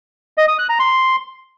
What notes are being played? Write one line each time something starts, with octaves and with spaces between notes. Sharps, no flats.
D#5
D#6
F#6
A#5
C6